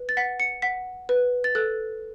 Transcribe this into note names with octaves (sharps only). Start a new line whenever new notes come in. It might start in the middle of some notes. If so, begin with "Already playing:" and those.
Already playing: B4
A6
F#5 B6
C#7
F#5 B6
B4
A6
A4 F#6